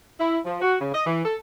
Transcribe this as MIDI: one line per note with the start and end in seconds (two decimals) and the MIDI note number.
0.20 0.38 64
0.45 0.60 53
0.62 0.75 66
0.80 0.90 49
0.93 1.03 75
1.06 1.22 52
1.25 1.35 69